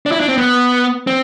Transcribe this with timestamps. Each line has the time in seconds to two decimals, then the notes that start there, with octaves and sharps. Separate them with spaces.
0.06 D4
0.12 E4
0.20 D4
0.29 C4
0.37 B3
1.07 C4